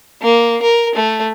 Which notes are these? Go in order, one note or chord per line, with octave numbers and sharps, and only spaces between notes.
A#3
A#4
A3